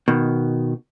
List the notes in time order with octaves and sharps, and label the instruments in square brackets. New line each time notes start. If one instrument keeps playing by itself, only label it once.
[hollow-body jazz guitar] B2 D#3